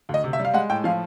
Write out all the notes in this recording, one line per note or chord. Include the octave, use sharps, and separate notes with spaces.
D2
D#5
C3
E5
G3
F5
G#3 F#5
A2 G5
F3 F5